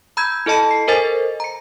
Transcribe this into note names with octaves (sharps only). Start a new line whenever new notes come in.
A#5 B5 E6 G6 G#6
E4 A4 D#5 A5 B5
C7
A4 A#4 C5 D#5 G#5 A6
A#5 C#7